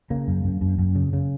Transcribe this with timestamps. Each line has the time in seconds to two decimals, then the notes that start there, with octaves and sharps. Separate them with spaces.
0.10 C#3 A#3
0.28 F#2
0.44 F#2
0.61 F#2
0.79 F#2
0.95 C#3
1.13 C#3